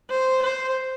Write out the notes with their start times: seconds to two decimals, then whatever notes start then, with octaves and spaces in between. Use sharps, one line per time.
0.10 C5
0.43 C5